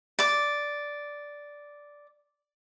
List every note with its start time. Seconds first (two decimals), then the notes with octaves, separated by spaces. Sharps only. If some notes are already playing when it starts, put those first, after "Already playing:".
0.19 D5 D6